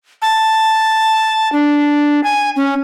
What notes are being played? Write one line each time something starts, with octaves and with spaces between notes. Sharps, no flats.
A5
D4
G#5
C#4